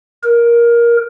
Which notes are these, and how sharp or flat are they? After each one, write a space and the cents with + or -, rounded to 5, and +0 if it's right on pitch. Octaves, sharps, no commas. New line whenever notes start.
A#4 +15